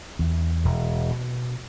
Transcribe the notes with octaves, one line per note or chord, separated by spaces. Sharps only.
E2
E1
B2